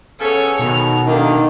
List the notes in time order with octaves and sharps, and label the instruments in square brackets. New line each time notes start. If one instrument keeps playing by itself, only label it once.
[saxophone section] C#3 B3 A4 [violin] C#5 G#5
[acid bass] B2 [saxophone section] D#3 [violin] F7
[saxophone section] D3 A3 A#3 [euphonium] D#3 [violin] D4